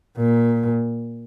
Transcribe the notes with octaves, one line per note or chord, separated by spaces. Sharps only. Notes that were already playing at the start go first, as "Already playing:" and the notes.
A#2